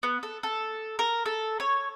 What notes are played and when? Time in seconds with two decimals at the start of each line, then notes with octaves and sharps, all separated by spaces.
0.03 B3
0.23 A4
0.43 A4
0.99 A#4
1.26 A4
1.60 C#5